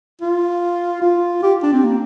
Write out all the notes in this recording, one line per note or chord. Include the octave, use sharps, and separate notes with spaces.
F4
F4
G4
D4
C4
A#3